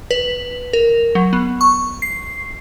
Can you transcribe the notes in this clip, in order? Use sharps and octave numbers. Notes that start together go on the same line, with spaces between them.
B4
A#4
F#3
B3
C#6
C7